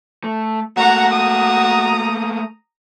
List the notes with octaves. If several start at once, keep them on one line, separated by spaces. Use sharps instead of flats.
A3
A3 A#3 F#4 F#5 A#5
A#5 D#6